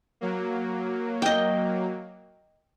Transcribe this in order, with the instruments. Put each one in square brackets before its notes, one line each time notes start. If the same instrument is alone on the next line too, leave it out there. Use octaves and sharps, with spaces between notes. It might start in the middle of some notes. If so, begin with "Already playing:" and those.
[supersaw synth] F#3 A#3
[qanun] D#5 G5